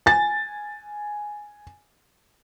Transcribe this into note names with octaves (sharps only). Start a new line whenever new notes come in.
G#5 A6